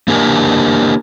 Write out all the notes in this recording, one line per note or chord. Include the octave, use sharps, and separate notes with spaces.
A#3 D4 G4 A#4 E5 G#5